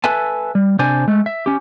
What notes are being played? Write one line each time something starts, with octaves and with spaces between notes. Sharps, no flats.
A4 B4 E5 G#5 A5
G3
C3 D4 C5 D5 G#5
G#3 A3
E5
C#4 G4